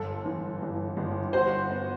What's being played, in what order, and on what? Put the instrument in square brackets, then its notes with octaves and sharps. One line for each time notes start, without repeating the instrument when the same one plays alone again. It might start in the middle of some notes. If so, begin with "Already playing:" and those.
Already playing: [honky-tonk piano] G1 [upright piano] A4
[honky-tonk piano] E3
G1
G1
[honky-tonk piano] F#4 [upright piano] C5
[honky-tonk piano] B3